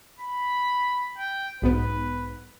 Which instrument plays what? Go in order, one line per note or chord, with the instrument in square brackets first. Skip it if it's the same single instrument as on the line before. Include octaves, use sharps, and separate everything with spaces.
[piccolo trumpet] B5
G5
[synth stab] B1 G#2 B3 [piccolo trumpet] B4